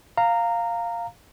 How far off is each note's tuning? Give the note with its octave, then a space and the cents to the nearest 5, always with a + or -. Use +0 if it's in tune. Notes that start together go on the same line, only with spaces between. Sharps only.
F5 +0 A#5 -15